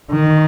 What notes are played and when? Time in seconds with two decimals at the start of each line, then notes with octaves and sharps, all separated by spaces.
0.11 D#3